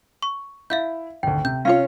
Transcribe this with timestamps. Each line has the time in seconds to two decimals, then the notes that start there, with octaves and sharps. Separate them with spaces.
0.22 C#6
0.70 E4 E5 F5 G6
1.23 G#1 D2 G5
1.45 C3 G6
1.65 C#4 F4 C#5 F5